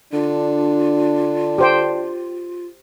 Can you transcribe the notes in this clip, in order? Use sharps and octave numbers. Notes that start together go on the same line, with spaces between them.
D3 D4 F4
G4 C5 G5